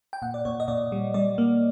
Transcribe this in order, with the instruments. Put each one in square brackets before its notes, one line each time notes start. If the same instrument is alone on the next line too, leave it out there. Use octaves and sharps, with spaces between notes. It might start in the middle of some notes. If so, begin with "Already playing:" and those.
[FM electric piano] G5
A#2 F#5
D5
A#2 C#5
D#5
A#2 D5
G3
G3 D5
A#3